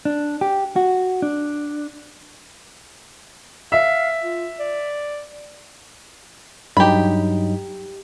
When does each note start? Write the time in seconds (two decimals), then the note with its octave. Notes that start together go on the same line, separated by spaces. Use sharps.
0.05 D4
0.41 G4
0.76 F#4
1.22 D4
3.72 E5 F5
4.23 F4
4.60 D5
6.77 G2 F#3 D#4 G4 B5